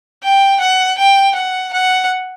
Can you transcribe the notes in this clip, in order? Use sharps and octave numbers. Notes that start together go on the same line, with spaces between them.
G5
F#5
G5
F#5
F#5